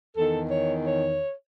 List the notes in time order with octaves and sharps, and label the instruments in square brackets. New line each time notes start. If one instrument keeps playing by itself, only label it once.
[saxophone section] E2 D#3 A4
C#5
C#5